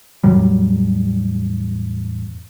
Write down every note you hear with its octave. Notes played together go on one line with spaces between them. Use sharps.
E2 A2 F#3 G3